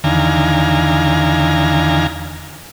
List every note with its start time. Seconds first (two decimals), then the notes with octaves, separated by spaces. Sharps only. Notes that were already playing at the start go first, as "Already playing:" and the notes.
0.04 E2 D3 D#3 F5 G#5 A#5